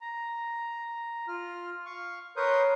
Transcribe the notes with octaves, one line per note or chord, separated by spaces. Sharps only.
A#5
F4 F6
F5 C#6
A#4 B4 C#5 C6 D#6 G6